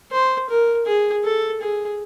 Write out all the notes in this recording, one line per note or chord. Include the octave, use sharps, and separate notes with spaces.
C5
A#4
G#4
A4
G#4